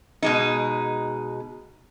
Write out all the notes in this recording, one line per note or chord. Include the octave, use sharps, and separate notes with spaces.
B2 G#3 D#4